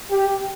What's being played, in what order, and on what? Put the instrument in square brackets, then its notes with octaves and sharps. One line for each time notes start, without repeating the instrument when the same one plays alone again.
[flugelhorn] G4